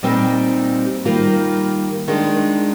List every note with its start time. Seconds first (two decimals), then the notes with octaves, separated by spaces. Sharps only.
0.03 A#2 G3 C4 D#4 G4
1.05 D#3 G3 A#3 F4
2.08 D#3 G#3 D4 F4